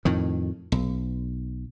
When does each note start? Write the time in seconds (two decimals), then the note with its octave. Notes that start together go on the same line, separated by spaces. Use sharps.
0.05 F2 A2 D#3
0.72 B1